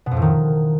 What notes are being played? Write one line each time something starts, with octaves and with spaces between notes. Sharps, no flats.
B2
F2
A2
D#3